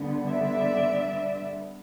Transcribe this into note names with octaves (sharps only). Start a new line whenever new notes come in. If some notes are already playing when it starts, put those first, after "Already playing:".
Already playing: D3 G3 B3
D5 E5